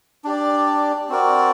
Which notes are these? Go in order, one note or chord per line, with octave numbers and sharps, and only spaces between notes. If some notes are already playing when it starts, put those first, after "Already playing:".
D4 G4 D5
C4 F#4 A#4 D5